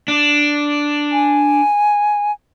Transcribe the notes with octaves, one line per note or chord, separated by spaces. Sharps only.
D4
G#5